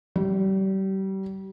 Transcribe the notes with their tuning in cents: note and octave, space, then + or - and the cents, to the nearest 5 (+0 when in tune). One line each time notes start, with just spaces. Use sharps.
G3 -30